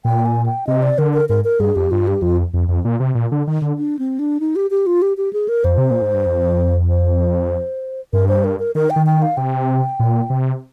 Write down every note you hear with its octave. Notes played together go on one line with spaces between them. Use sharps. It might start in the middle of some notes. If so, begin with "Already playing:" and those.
A#2 G5
G#5
G5
C3 D#5
D5
D3 A#4
A#4
G#2 A#4
A#4
G2 G#4
F2 G4
G2 F4
G4
F2 F4
F2
F2
A#2
C3
A#2
D3
D#3
D3
D4
C4
D4
D#4
G4
G4
F4
G4
G4
G#4
A#4
F2 C5
C3
A#2
G#2
G2
F2
C5
G2 A#4
C5
A#4
A#4
D#3 A#4
G5
D#3
G5
F5
C3 G5
A#2
C3